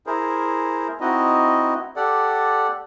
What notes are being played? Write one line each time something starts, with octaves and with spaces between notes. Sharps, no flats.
E4 G#4 A#4 C5
C4 D#4 E4 F#4 D#5
G4 A4 D5 F#5